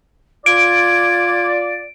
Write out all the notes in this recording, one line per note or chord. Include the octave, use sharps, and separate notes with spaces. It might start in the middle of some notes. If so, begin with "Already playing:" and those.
F4 D5 G#6 D7